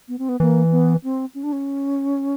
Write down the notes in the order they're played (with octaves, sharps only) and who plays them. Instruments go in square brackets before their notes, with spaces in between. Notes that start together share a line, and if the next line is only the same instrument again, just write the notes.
[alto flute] B3
C4
B3
[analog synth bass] E3 [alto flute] A#3
[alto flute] B3
C4
C#4
D4
C#4